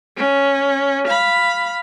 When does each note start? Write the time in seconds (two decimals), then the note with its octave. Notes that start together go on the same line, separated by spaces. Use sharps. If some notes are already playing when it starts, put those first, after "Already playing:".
0.17 C#4
1.08 F5 B5